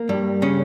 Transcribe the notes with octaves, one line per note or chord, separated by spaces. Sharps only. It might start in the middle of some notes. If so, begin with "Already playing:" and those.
Already playing: A#3
G2 G3
C#3 C#4